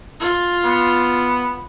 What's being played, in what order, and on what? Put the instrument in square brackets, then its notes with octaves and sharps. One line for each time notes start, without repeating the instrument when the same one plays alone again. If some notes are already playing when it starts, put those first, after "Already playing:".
[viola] F4
[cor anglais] B3